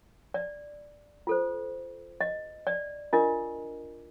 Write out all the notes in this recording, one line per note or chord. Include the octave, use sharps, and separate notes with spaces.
D5
F4 A4 C5
D#5
D5
D4 F4 A#4 D#5